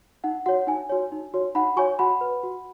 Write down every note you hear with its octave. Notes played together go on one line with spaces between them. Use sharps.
D#4 F#5
F#4 C#5 F#5
D#4 G#5
F#4 C#5
D#4
F#4 C#5
D#4 F#5 B5
F#4 C#5 G#5 C#6
F#4 F#5 B5
B4
F#4